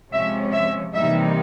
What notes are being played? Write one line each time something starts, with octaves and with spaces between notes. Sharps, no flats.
C3 F3 G#3 C#4 E5
E5
C3 E3 G3 A#3 D#4 E5